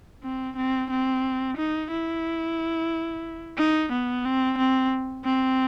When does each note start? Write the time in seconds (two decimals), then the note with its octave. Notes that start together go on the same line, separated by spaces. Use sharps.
0.23 C4
0.57 C4
0.90 C4
1.57 D#4
1.91 E4
3.58 D#4
3.92 B3
4.25 C4
4.58 C4
5.25 C4